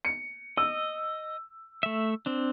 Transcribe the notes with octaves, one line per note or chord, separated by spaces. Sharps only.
C#7
D#5 E6
A3 E5
C4 D4